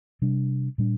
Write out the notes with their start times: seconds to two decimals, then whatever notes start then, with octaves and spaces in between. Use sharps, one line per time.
0.22 C3 G3 D4
0.78 A#2 G3 D4